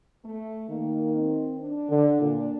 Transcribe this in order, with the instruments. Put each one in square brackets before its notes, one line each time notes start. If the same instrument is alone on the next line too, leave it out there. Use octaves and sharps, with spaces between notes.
[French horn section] A3
[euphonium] D#3 [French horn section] A#3
[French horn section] C4
D4
[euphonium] D3
A#2